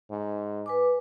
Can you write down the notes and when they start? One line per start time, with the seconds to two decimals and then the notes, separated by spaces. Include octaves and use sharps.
0.11 G#2
0.66 B4 G#5 D6